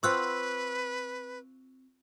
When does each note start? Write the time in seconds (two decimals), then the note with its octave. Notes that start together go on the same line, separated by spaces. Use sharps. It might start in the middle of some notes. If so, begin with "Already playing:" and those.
0.03 C4 F4 B4 F#5 C#6 E6 F#6